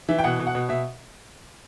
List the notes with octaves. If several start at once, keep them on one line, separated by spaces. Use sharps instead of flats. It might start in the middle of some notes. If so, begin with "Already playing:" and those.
E3 E5
G5
B2 F#5
B2
F#5
B2
B2 E5